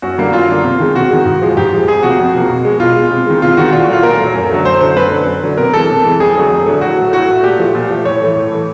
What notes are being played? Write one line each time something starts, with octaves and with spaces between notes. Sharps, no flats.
F#2 F#4
D3 G3 A#3
F#2 F4
D3 G3 A#3
C3
D#3 G#3
C3 F#4
D#3 G#3
G#2
F3 G#3
G#2 G4
F3 G#3
F2 G#4
C3 F3 A#3 F#4
F2
C3 F3 A#3
B2
G#3
B2 F4
G#3
C3
D#3 G#3
C3 F4
D#3 G#3 F#4
A#2 F4
F#4
F#3 A3 F4
A#2 A#4
F#3 A3
F#2
D3 F#3 A3
F#2 C5
D3 F#3 A3 C5
F#2 B4
D3 F#3
F#2
D3 F#3
C3 A#4
E3 G#3 A4
C3
E3 G#3
F2 G#4
D3 F#3 A3
F2
D3 F#3 A3
A2 F#4
F#3 A3
A2 F#4
F#3 A3
A#2 G4
F3 A3
A#2
F3 A3
A2 C#5
E3 A3
A2
E3 A3